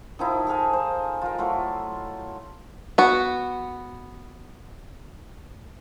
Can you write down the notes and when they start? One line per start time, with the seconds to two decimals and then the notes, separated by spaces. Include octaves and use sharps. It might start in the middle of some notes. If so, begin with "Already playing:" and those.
0.19 D#3 F3 D#4 E4
0.47 G#4 A4 F5 G#5
0.73 C5
1.22 F4 A#4
1.38 F#3 A3 E4 F4
2.98 B3 F#4